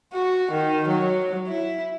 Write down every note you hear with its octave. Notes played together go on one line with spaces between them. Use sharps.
F#4
D#3
F#3
E4